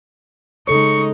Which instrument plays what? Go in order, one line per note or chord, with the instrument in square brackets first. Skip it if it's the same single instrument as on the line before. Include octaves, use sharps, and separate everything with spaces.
[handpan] C#3 A4 C#5 [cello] G#3 D#4 [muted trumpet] C#6